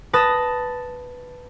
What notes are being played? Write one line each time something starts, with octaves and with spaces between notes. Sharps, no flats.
B4 A5 D#6 A#6